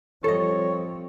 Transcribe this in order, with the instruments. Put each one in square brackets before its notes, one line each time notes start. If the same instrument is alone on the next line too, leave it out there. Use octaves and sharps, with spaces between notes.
[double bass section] F3 G3 C4 [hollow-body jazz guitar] A4 D#5 [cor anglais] C#5